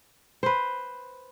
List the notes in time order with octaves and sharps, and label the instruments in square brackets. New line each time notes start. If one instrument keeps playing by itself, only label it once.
[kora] B4 C5